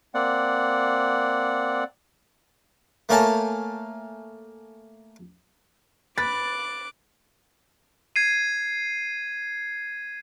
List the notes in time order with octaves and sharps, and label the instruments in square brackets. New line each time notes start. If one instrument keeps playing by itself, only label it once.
[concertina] A#3 C4 D5 F#5
[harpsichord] A3 A#3 A#4 C#5 G#5 A5
[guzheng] B4 [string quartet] D6 F#6 [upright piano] A6
[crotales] G#6 C7 D#7